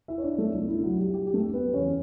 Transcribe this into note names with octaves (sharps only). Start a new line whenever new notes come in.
E4 E5
C#5
D4 D5
A3 A4
C#2 B2 A3 D4
E4
F#3 F#4
G3 G4
G3 G4
G4
A3 A4
B3 B4
E2 C#3 G3 C#4 C#5